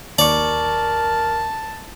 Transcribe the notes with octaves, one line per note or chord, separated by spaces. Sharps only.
D#2 A#4 D5 A5 C#6